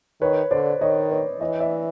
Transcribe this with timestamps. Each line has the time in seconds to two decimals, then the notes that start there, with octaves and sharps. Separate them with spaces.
0.21 D#3 B4 C#5
0.51 D3 C5 D5
0.81 D#3 C#5 D#5
1.11 B4 C#5
1.40 E3 C#5 D#5
1.60 D5 E5